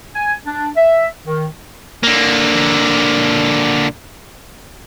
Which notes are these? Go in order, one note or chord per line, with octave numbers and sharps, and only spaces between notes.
G#5
D4
E5
D#3
D3 A#3